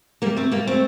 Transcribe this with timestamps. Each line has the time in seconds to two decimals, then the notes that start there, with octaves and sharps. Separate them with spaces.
0.22 G3 A#3
0.36 A3 C4
0.51 G3 A#3
0.67 A3 C4